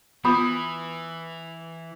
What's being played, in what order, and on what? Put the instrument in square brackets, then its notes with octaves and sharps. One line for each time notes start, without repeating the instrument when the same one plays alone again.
[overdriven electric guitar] E3 [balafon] B3 F4 [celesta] B5 D#6